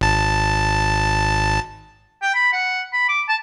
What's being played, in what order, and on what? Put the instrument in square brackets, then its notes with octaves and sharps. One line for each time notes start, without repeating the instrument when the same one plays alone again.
[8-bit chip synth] G#1 A5
[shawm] G5
B5
F#5
B5
D6
A5